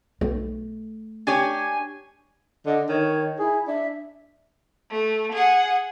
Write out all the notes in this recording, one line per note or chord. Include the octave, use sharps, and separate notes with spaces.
B1 A3
D4 G4 C#5 G#5
D3 D#5
D#3 C#5
E4 G#4
D4 E5
A3
G#4 F#5